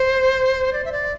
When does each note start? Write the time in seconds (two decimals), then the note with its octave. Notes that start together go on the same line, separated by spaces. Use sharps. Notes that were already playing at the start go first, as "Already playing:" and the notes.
Already playing: C5
0.73 D5
0.84 E5
0.92 D5